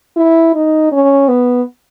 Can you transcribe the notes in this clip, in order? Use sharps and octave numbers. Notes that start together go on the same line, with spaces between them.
E4
D#4
C#4
B3